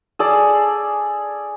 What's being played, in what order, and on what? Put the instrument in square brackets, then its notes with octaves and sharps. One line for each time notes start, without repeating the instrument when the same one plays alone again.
[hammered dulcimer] G#4 A4 D5